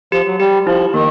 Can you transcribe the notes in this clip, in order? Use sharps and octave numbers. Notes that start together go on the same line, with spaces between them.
F3 G4
F#3
G3 G4
F3 E4
D#3 A#3